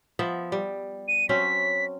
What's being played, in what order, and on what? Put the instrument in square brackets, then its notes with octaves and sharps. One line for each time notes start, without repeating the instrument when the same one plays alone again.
[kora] F3 B3 E5
G3
[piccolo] D#7
[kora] F#3 C4 C#4 [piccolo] B6